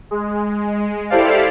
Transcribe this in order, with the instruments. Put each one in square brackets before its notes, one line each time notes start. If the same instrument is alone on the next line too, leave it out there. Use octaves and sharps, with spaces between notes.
[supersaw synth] G#3
E4 G4 A4 C5 D5 F5